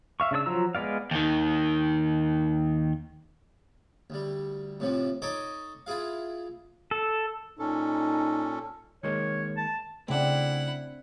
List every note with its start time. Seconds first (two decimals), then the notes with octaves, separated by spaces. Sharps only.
0.20 E5 F5 C#6
0.31 C#3 D4 C#5 E6
0.46 F3 F#3 F4 A#5 E6
0.75 G#3 B3 D5 F5
1.11 D#2 D#3
4.10 D2 G3
4.80 A2 C3 F3
5.22 D#4 A4 C#5 D#5 C#6 D6
5.87 E4 F4 G#4 F5
6.91 A4
7.59 A#2 C#4 D#4 A4
9.03 D#3 G#3 A#3 C#5
9.57 A5
10.08 C#3 A3 C4 D4 E4 F#5